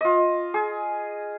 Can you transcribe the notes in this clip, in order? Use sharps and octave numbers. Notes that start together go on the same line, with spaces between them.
F4 D#5
G#4